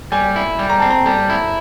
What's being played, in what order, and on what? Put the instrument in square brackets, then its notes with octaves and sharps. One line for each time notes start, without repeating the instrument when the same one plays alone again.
[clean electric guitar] G3 [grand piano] G#5
[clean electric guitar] E4
G3
[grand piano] A#5
[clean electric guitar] C4 [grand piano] A5
[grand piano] A#5
[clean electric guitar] G3 [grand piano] A5
[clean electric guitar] E4